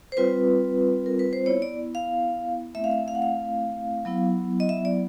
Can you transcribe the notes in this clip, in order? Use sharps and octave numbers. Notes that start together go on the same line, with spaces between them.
C5
G3 C4 F4 B4
A#4
B4
C5
B3 E4 C#5
D5
F5
A3 C4 E4 E5
F5
E5
F5
F#5
F5
F#3 B3 E4
D#5
E5
D5